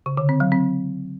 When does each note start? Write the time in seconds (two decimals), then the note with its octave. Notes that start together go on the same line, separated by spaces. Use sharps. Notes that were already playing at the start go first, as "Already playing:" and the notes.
0.06 C#3
0.17 D3
0.29 C4
0.40 F#3
0.52 C4